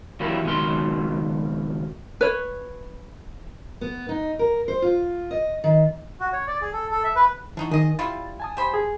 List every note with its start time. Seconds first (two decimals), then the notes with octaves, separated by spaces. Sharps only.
0.20 E3 F#3 A#3 E4 G4 A#4
0.45 C#2 B2 D#3 F#3 C6
2.21 B4 C#5
3.81 B3
4.09 D#4
4.39 A#4
4.68 C5
4.82 F4
5.31 D#5
5.64 D#3
6.20 F#4
6.33 C#5
6.47 D5
6.61 G#4
6.73 A4
6.91 A4
7.04 E5
7.16 B4
7.57 E3 D4 D#4 F#4
7.71 D#3 G#4 D#5
7.99 G3 E4 F4 A6
8.40 G#5 A5 D#6
8.57 G4 C5 B5
8.74 G#4